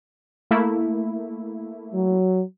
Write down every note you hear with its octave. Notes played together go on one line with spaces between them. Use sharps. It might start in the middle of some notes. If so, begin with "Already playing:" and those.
A3 A#3 E4
F#3